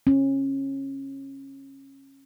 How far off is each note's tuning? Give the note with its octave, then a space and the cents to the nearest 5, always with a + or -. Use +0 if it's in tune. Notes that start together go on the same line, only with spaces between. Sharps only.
C#4 -25